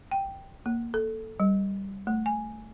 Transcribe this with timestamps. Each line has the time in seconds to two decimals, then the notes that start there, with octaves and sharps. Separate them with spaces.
0.11 G5
0.66 A#3
0.94 A4
1.40 G3
2.07 A3
2.26 G#5